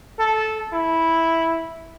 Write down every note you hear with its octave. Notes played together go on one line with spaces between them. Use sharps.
A4
E4